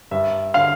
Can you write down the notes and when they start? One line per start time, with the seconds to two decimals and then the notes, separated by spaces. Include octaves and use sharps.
0.11 G2 E5
0.54 D3 F5